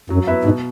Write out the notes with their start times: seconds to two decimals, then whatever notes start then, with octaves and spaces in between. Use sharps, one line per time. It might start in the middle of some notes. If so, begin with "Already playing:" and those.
0.10 F#2 F#3
0.27 F#2 B3 E4 B4 E5
0.45 G#2 B2